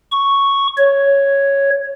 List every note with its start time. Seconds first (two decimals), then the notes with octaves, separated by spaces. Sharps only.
0.12 C#6
0.77 C#5